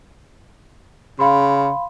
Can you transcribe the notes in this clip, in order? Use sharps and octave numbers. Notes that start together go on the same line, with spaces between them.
C#3 F5 B5 C6